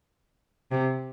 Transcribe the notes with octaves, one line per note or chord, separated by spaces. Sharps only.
C3